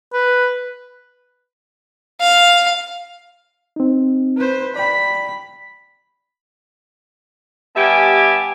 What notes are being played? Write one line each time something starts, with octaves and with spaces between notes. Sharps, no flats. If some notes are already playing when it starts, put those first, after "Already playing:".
B4
F5
C4 D#4
B4 C5
D5 G5 B5
G3 B3 G4 E5 G#5 A5